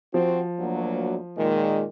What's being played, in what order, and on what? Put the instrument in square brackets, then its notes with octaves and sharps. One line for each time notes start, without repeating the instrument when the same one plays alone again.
[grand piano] F3 [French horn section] C4 F#4
[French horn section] D2 F#3 A#3
A#2 D#3 G#3